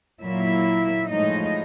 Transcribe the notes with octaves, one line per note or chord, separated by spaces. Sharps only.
A#2 F#3 A#3 E4 E5
A2 F3 G#3 D#4 D#5